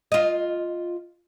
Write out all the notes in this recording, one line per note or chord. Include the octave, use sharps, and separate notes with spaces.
F4 D#5